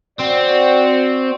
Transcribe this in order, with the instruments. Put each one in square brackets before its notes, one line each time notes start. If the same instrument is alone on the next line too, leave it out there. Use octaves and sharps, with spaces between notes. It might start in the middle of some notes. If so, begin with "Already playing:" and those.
[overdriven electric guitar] C4 [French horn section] F#4 D5